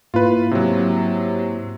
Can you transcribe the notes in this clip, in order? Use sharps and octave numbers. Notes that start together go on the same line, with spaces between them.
G#2 A#3 E4 F4 B4
C3 F#3